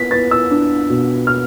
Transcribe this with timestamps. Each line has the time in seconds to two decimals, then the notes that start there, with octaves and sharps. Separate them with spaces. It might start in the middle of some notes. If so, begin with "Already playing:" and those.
Already playing: B3 B6
0.11 B3 A6
0.31 E6
0.51 D4
0.90 B2
1.27 F6